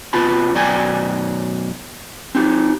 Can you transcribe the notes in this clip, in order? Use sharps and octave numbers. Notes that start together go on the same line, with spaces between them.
C3 B3 F4 A5 B5
F#2 B2 D5 G5 G#5 A#5
C4 D#4 G4